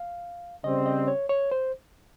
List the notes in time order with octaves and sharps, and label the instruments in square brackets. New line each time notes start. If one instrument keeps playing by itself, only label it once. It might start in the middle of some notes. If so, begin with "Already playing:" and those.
Already playing: [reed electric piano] F5
[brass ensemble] C#3 G3 C4 [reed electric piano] D#5
[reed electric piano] D#5
C#5
C#5
C5